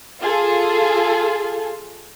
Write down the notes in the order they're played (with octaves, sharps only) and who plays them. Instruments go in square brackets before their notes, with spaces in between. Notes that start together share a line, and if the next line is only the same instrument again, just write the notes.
[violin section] F4 G#4 A4